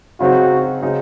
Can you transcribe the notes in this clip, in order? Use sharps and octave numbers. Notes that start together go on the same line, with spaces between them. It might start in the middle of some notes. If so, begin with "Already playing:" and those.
C#3 F#3 C4 D#4 F#4
C#3 F#3 C4 D#4